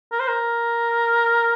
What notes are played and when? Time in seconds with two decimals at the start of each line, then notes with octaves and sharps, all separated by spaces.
0.12 A#4
0.20 C5
0.28 A#4